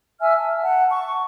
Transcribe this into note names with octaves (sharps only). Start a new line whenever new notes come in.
E5 G#5 E6 F6
A5
F#5 A5
C#6